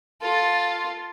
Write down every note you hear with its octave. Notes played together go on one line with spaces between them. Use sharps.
F4 A4